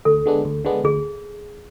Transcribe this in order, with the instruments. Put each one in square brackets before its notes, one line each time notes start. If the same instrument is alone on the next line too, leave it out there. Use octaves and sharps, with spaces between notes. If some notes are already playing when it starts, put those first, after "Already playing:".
[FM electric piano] D2 [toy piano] A4
[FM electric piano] D3 G#3 B3 D4
D2
D3 G#3 B3 D4
[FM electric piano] D2 [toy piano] G#4